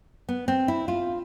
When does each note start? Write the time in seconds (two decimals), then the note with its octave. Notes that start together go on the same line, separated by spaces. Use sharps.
0.29 B3
0.48 C4
0.68 E4
0.88 F4